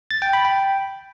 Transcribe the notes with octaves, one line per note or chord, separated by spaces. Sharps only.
A6
G5
B5
G5